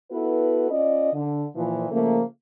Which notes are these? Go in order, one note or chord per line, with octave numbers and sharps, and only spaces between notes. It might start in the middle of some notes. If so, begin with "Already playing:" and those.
B3 E4 F#4 A4 B4
C#4 F4 D5 D#5
D3
A#2 E3 F3
C#3 F3 A3 A#3